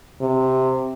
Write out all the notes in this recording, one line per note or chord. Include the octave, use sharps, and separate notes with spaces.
C3